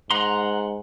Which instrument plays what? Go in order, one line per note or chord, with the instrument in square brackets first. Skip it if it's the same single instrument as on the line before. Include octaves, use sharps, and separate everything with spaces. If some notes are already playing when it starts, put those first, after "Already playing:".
[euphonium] G#2 [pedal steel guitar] F#5 A#5 C6